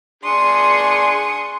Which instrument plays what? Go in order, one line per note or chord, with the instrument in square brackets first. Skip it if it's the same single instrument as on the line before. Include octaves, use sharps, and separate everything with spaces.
[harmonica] D4 G#4 [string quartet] C6 C#6 D#6